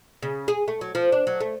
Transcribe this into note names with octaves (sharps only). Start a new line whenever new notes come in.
C#3
G#4
A3
F#3
F3
D4
F#3
A3